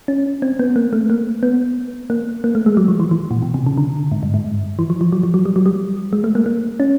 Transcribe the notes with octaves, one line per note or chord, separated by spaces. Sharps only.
C#4
C4
B3
A#3
A3
A#3
B3
A#3
A#3
A3
G#3
F#3
F3
E3
E3
A#2
B2
C3
C#3
D3
G#2
G2
G#2
E3
F3
F3
F#3
F3
F#3
G3
F#3
G3
G#3
A3
A#3
A#3
C#4